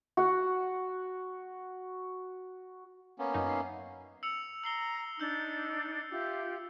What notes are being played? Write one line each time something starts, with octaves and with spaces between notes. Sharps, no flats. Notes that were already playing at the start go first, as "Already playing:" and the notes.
F#4 F#5
A#3 B3 C#4
F#2 D#4
E5 C7
E6 C#7 F7
A#5 E6 C7 G7
D4 D#4 E6 G6
F4 G4 E5